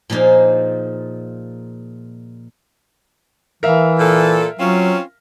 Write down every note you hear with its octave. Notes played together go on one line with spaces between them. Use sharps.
A#2 F3 A#3 D#4 G#4
E3 A#4 E5 F5
A#2 A4
F#3 C4 C#4 F4